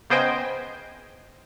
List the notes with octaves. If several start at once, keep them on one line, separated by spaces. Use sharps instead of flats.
C#3 B3 C5 D#5 G5 G#5